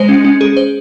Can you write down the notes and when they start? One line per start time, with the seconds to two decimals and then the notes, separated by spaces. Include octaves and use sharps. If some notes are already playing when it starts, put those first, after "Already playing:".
Already playing: G#3 C5
0.09 C#4
0.24 C#4
0.41 G#4
0.57 C5